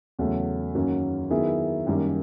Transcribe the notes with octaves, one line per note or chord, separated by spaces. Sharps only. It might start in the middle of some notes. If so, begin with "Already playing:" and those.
E2 C#3 F#3 A3 C#4
F#2 D#3 F#3 A#3 C#4
D#3 F#3 B3 E4 G#4
F#2 D#3 G3 A#3